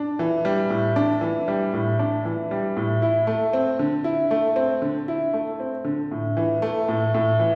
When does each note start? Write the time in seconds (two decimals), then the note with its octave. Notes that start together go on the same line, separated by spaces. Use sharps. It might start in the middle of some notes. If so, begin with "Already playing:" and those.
Already playing: D4
0.19 E3
0.45 G3
0.70 A2
0.96 D4
1.21 E3
1.48 G3
1.73 A2
1.99 D4
2.25 E3
2.51 G3
2.77 A2
3.02 E4
3.27 A3
3.53 C4
3.79 D3
4.04 E4
4.31 A3
4.56 C4
4.82 D3
5.08 E4
5.33 A3
5.60 C4
5.85 D3
6.11 A2
6.37 E3
6.62 A3
6.88 A2
7.14 A2
7.40 E3